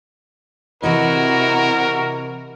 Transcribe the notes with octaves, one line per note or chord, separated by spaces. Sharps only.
C3 E3 E4 F#4 A#4 D#5